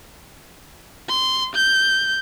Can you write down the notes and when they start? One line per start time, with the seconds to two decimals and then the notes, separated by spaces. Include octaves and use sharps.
1.09 C6
1.55 G6